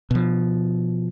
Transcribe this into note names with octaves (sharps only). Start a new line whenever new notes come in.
B2 F3